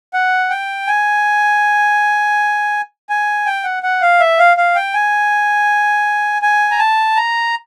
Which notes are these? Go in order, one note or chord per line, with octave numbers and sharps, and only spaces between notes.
F#5
G5
G#5
G#5
G5
F#5
F#5
F5
E5
F5
F5
G5
G#5
G#5
A#5
A5
A#5